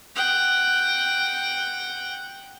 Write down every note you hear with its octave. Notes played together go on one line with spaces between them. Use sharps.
F#5 G5